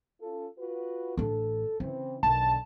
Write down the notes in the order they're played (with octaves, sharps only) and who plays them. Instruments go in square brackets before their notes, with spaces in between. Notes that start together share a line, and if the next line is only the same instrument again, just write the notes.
[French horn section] C#4 F4 A4
F4 F#4 B4
[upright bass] A1 D4 [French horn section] A4
[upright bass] C#3 [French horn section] E3 C4
[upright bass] B1 [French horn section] D3 D#3 [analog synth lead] A5